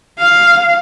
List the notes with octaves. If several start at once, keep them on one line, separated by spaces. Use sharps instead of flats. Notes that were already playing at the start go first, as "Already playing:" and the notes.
F5